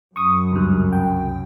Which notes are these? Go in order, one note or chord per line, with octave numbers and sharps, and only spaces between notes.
F#2 C#6 D#6
C#2 G2
C2 G5